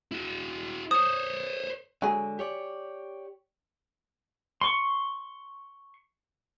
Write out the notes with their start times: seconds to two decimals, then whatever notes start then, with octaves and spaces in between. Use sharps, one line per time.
0.11 E4 F#4
0.91 C5 C#5 D#6
2.02 D3 F#3 G#3 G#4
2.39 G4 C#5 D5
4.61 C6 C#6